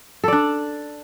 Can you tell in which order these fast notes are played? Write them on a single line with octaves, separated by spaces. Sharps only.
A4 D5 D4